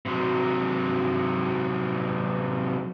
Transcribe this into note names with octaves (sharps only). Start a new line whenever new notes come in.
C3 F#3